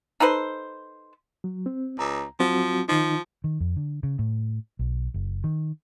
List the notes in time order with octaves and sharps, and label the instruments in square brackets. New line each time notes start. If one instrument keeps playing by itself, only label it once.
[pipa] D#4 A4 B4 C5
[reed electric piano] F#3
C4
[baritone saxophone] C#2 [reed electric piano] A#5
[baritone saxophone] F3 [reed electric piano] F#3 C4 F#4
[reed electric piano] D#3 D#4 [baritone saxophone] F3
[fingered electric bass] D#3
F2
D3
C#3
A2
B1
F#1
D#3